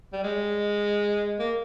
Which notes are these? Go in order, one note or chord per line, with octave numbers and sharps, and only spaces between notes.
G3
G#3
A#3